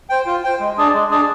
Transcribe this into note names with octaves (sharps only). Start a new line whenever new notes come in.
C5 G5
F4
C5 G5
G#3
D4 G#4 D5
G#3
D4 G#4 D5